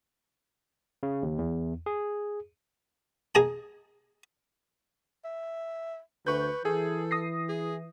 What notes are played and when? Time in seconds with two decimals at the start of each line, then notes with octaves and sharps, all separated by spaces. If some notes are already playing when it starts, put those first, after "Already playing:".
1.03 C#3
1.23 D#2
1.38 E2
1.86 G#4
3.35 G#4 D#5 A5 A#5
5.25 E5
6.27 D2 B4 C#6 G6
6.65 E3 G#4 A4
7.11 D#6 A#6 C7
7.49 G#4